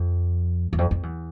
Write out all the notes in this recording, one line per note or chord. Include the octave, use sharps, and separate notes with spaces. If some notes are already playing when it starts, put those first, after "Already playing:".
Already playing: F2
E2
F2
F2
E2